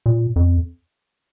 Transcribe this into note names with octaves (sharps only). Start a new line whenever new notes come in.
A#2
F2